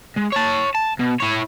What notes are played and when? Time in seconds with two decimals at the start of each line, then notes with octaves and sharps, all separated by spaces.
0.17 G#3
0.33 C#5 A5
0.75 A5
0.99 B2
1.20 E4 C#5